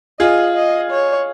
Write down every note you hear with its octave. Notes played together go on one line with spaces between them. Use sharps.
F4 G#4 D#5
D#5
C#5